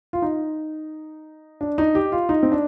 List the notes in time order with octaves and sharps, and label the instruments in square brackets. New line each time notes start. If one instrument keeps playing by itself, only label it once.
[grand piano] F4
D#4
D4
D#4
G4
F4
D#4
C4
D4